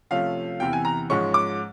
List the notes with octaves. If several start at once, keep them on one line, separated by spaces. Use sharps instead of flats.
C3 F3 A3 C#4 F5
E2 C3 E3 G5
G#5
A#5
G#2 F3 G#3 C#4 C#6
D6